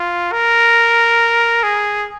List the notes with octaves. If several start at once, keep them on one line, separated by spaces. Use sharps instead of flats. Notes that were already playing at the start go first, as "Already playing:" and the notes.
Already playing: F4
A#4
G#4